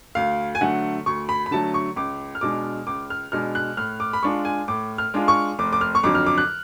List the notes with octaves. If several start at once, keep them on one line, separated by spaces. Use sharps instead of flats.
D2 F5
G#5
D3 F#3 A3 F#5
D2 C#6
B5
B5
D3 F#3 A3 A5
C#6
C#2 D6
F6
B2 G#3 D4 D6
C#2 D6
F6
B2 G#3 D4 F6
F#6
A2 F6
D6
B5
G#3 D4 F4 C#6
G#5
A2 D6
F6
G#3 D4 F4
C#6
F1 D6
D6
F6
C#6
F2 D3 F#3 D6
F6
D6
F#6